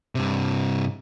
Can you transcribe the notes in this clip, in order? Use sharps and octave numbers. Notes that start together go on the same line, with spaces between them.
G2 C3